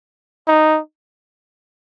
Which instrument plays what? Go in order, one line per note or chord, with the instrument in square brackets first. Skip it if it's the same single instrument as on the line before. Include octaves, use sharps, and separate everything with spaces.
[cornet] D#4